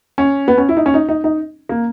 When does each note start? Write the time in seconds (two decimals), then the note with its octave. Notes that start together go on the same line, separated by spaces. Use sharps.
0.18 C#4
0.48 B3
0.58 C#4
0.69 E4
0.77 D#4
0.86 C#4
0.94 D#4
1.09 D#4
1.24 D#4
1.69 A#3